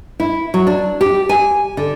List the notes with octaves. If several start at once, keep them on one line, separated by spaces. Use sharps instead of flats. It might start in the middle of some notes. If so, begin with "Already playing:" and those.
E4
F#3
D4
G4
G#5
D3